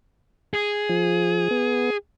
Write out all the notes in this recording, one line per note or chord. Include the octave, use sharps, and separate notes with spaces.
G#4
F3
B3